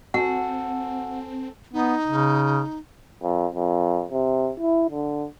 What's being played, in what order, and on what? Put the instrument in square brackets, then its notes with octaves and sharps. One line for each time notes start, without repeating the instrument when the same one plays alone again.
[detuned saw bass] C4 [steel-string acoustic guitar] F#4 [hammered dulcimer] A4 G#5 [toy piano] F#5
[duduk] B3 [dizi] D#4
[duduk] C#3
[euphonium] F2
F2
C3
E4
D3